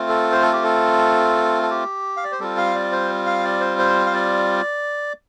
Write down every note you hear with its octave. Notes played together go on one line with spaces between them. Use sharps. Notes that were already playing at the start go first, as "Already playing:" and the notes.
Already playing: A3 C4 F4
A4
C5
A4
G4
A4
A4
G4
F5
D5
C5
G3 C4 F4 A4
F5
D5
C5
F5
D5
C5
C5
F5
D5